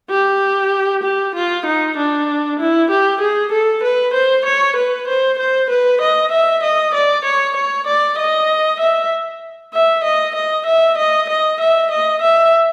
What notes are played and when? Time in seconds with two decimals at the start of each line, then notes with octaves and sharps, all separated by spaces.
0.10 G4
1.03 G4
1.35 F4
1.66 D#4
1.97 D4
2.60 E4
2.90 G4
3.21 G#4
3.52 A4
3.83 B4
4.14 C5
4.45 C#5
4.76 B4
5.08 C5
5.39 C5
5.70 B4
6.01 D#5
6.32 E5
6.63 D#5
6.94 D5
7.25 C#5
7.56 C#5
7.87 D5
8.18 D#5
8.80 E5
9.74 E5
10.04 D#5
10.35 D#5
10.66 E5
10.98 D#5
11.29 D#5
11.60 E5
11.91 D#5
12.22 E5